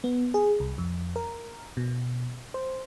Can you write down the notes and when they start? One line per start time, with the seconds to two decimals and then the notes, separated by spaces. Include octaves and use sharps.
0.04 B3
0.34 G#4
0.60 C2
0.78 F2
1.16 A#4
1.77 B2
2.54 C5